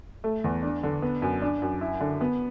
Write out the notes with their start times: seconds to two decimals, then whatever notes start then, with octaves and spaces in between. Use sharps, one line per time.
0.24 A3
0.44 E2
0.62 D4
0.83 D3
1.02 B3
1.22 F#2
1.42 D4
1.62 F#2
1.81 E4
2.01 D3
2.21 B3